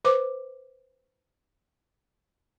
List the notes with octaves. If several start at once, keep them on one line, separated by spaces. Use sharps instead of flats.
B4 C5 D6